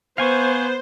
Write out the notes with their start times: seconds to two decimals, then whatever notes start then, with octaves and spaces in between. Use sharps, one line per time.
0.18 B3 C5 F5 G#5 C#6